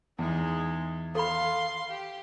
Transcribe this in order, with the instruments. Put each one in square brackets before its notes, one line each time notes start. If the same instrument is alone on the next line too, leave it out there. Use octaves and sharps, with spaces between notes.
[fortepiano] E2 [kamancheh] G#3 D#4
[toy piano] A4 B5 [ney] F5 [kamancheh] C6
[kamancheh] G4